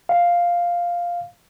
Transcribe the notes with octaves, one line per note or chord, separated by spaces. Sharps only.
F5